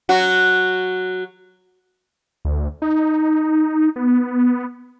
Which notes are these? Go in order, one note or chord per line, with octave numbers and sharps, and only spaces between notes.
F#3 F#4
D2
D#4
B3